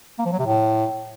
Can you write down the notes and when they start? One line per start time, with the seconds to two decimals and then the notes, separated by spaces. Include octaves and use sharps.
0.19 A#3
0.26 F3
0.32 F#3
0.39 C3
0.46 A2